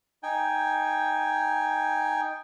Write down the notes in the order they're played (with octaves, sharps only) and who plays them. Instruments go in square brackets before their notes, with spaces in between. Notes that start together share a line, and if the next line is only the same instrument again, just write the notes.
[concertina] D#4 G5 G#5